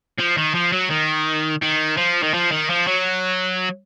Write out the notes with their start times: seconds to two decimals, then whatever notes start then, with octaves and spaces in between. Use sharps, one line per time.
0.18 F3
0.37 D#3
0.54 F3
0.72 F#3
0.90 D#3
1.62 D#3
1.97 F3
2.23 D#3
2.34 F3
2.52 D#3
2.70 F3
2.87 F#3